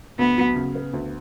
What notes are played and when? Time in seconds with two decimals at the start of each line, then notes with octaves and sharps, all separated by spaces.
0.19 D2 B3
0.38 F#3
0.56 C#3
0.75 B3
0.93 D2